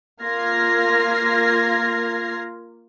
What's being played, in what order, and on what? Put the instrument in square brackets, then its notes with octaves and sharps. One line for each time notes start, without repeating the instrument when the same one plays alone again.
[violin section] A#3 F4 F6 G#6 A#6 C7